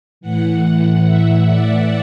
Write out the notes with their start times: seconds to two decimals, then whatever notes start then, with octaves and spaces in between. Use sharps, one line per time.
0.21 A2 E3 F#5
0.63 F#5
1.06 E5
1.48 D5